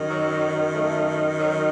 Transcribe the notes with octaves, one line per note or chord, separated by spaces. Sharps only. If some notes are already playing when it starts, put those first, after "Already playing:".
Already playing: F#2 D#3
F#3
A3
F#3